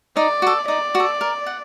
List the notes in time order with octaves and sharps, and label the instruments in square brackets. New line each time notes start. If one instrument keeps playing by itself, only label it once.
[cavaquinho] D#4 [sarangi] D5
[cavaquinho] F#4 A4
[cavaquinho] D#4 [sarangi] D5
[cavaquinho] F#4
A4
A#4
F#5